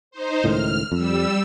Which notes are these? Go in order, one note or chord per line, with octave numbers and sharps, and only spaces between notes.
D#4 C5
C#2 A2 D#3 F6
F2 G3 E6